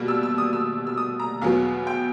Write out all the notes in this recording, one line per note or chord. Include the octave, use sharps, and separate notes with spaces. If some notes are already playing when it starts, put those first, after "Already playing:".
Already playing: B2 G3 A#3
E6
E6
D#6
E6
E6
D#6
A#5
E2 B2 F#3 B3 F5
G5